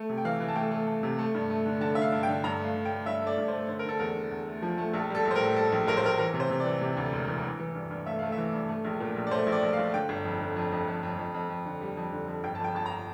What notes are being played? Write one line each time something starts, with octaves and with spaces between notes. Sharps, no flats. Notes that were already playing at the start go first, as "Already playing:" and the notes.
Already playing: A3
C3
G5
E3 F5
E3
A5
A3 G5
A3
A3
C3
A3
G2
A3
D3
D3 A5
D3 E5
F5
G2
G5
D3
G2 A#5
A3
F5
D3
G5
A3
G2 E5
A3
D5
G2
C5
A3
D3 C5
A#4
D3 A4
E2 A#4
D3
E2
A3
F3
A3
A#1 A4
G3 A4
A#1
C5
A#4
A2
G3 A4
A#1
A#1 A#4
C5
A#1 A#4
E3 A#4
C3
C5
C3
D5
E3
C3
D2
E1
E3
E3
E3
G2
G2
A3 E5
A3 F5
E5
E3
G2
A3
A#1
A#2
A#1
D5
A3 C5
A#1
D5
A#1
F5
A#1
D3 G5
G1
F2
D3
F2
F2
F2
F2
F2
F2
F2
D3
G3
F2
D3
F2
G1 G5
A5
F2 G5
G1 A5
A#5